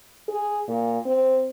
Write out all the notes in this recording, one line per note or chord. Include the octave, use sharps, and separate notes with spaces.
G#4
A#2
C4